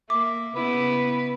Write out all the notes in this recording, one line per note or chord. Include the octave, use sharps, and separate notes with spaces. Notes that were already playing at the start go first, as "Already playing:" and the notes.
A#3 E5 D6
C#3 B3 E4 B4